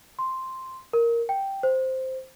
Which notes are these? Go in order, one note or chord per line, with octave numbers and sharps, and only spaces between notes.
C6
A#4
G5
C5